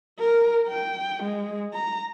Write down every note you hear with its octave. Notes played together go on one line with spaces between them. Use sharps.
A#4
G5
G#3
A#5